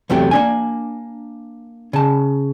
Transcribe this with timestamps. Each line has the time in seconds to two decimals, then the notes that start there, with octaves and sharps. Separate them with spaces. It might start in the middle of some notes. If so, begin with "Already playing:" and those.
0.10 E2 C3 F#3 A3 G4
0.31 A#3 D4 G#5
1.93 C#3 A5